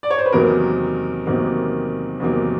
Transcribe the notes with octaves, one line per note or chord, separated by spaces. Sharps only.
D5
C#5
C5
B4
E2 C3 D#3 F#3 A#3 A#4
E2 C3 D#3 F#3 A#3
E2 C3 D#3 F#3 A#3